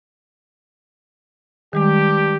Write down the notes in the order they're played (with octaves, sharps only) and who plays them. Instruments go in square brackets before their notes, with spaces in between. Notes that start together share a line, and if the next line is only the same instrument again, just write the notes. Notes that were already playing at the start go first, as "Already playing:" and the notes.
[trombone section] G2 G4 [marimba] D#3 G3 G#3